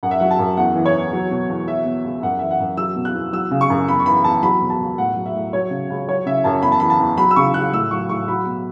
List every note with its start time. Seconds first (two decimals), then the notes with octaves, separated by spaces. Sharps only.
0.03 F#2 F#5
0.11 E5
0.20 F#3 F#5
0.31 A5
0.39 F#2
0.57 E2 F#5
0.76 E3
0.86 C#5
0.94 E2
1.13 F#3
1.31 B2
1.50 E2
1.67 F#3 E5
1.85 B2
2.04 C#2
2.22 F#2 F#5
2.39 E3 E5
2.51 F#5
2.60 F#2
2.77 F#3 E6
2.96 B2
3.05 F#6
3.14 E2
3.33 F#3 E6
3.51 C#3
3.61 C#6
3.70 F#2
3.88 E2 B5
4.00 C#6
4.06 E3 B5
4.24 E2 A5
4.43 F#3 B5
4.61 B2
4.70 A5
4.80 C#2
4.98 A2 F#5
5.16 F#3
5.26 E5
5.34 A2
5.53 F#3 C#5
5.71 C#3
5.90 C#2
6.08 F#3 C#5
6.26 C#3 E5
6.44 F#2 A5
6.62 E2 B5
6.72 A5
6.80 E3 B5
6.90 A5
7.00 E2
7.18 F#3 B5
7.31 E6
7.36 C#3 C#6
7.54 C#2 F#6
7.73 A2 E6
7.91 F#3 C#6
8.09 A2 C#6
8.28 F#3 B5
8.46 B2